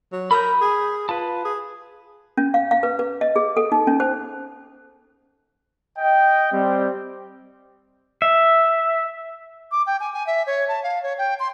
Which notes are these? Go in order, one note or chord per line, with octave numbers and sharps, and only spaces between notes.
F#3
A#4 B5 D#6 G6
G#4
F4 B4 A5
G#4
C#4
F5
F5
B4
B4
D#5
G#4
A4
D#4
C#4
C5
D#5 G5
G3 C4
E5
D6
G5
G#5
G#5
E5
C#5
A5
F5
C#5
G5
C6